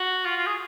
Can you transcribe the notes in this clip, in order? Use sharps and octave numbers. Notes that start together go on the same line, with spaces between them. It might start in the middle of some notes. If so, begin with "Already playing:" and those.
Already playing: F#4
F4
F4
G#4